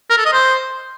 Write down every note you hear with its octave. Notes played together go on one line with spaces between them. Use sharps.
A#4
A4
D#5
C5